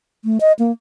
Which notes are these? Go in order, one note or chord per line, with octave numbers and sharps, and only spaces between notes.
A3
D#5
A#3